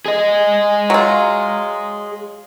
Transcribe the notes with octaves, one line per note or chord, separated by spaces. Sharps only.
G#4 D#5
F#3 F4